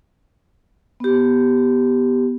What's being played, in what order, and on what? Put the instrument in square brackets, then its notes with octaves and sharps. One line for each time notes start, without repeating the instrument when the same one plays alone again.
[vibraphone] B3 G4